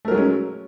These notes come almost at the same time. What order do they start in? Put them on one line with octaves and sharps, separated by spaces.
A3 A#4 F#3 G#3 C#4